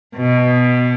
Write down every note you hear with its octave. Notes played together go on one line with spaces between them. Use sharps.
B2